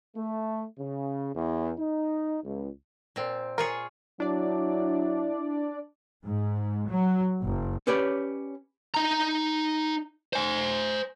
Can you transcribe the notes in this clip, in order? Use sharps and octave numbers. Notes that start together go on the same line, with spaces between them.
A3
C#3
E2
D#4
C#2
A#2 C4
F4 G#4 A#4 C#5
F#3 D4 E4 D5
G#2
F#3
F#1
C#4 G4 B4 C#5 D5
D#4 A#5
C5 G#5